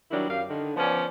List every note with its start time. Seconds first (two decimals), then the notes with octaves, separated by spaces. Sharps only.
0.11 D#3 F#3 G3 D4 E4
0.29 F#2 G4 F5
0.48 D3 D#3
0.76 F3 B3 C#4 D5